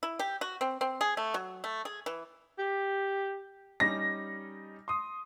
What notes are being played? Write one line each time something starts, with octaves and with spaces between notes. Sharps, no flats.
E4
G4
F#4
C4
C4
G#4
A3
F#3
A3
G#4
E3
G4
G3 C#4 D#4 A#6
C6 D#6